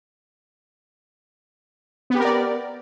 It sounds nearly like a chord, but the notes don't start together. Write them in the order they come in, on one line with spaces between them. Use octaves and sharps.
B3 G4 A#4 D5